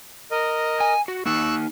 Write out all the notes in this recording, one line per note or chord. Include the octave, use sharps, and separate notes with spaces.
A#4 D#5
G#5
F#4
A#3 D#4 C#6 E6 F#6